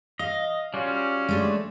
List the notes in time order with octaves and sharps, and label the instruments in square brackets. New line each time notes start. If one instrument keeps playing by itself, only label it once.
[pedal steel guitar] D#5 [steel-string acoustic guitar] F5
[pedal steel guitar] G3 F4 F#4 [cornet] C#4
[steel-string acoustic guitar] G#3 A3 D4